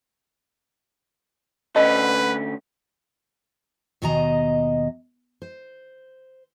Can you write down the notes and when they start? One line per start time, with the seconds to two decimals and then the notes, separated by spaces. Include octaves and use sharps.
1.76 D2 C#4 A4 B4 D#5
4.02 D#2 B2 D#3 D#5 G#5 A#5
5.42 C5